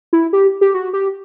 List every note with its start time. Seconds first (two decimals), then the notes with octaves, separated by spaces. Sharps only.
0.13 E4
0.33 G4
0.61 G4
0.74 F#4
0.93 G4